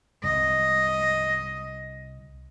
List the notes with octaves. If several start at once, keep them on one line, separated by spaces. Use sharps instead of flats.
C2 D#5